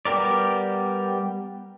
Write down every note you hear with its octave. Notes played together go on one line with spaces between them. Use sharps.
G3 B3 G4 A#4 D5